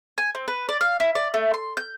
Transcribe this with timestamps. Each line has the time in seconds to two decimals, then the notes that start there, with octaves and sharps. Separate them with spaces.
0.18 G#5
0.35 C4
0.48 B4
0.69 D5
0.81 F5
1.00 E4
1.15 D5
1.34 A3
1.54 C6
1.77 G6